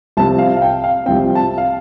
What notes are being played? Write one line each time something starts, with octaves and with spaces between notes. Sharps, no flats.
C2 C3 F3 C4 A5
F5
F5
G5
F5
C2 C3 F3 C4 G5
A5
F5